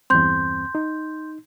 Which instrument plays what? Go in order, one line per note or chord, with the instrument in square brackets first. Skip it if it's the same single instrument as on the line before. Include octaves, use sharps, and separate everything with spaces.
[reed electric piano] E2 G2 C4 [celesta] C6 G6
[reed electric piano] D#4